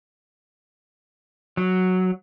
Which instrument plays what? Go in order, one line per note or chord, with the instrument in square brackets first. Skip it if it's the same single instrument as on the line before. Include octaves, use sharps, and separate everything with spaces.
[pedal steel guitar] F#3